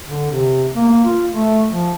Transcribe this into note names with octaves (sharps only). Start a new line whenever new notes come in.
D3
C3
A#3
A#3
F4
A3
F3